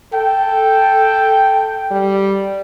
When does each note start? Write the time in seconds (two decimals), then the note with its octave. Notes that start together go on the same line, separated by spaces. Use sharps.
0.14 A4 G5
1.91 G3